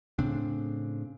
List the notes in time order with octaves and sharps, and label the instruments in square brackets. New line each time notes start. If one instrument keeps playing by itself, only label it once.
[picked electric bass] A2 C#3 C4 D4